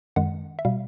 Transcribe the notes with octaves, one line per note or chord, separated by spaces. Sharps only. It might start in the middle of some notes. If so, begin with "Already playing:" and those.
F#2 D#3 G#3 F#5
E5
B2 G3 F5